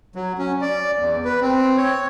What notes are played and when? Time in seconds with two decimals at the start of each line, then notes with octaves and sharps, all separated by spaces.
0.16 F#3
0.39 C#4
0.61 D5
0.99 E2
1.25 B4
1.41 C4
1.77 C#5